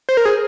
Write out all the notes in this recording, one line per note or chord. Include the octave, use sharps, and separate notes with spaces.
C5
A#4
G#4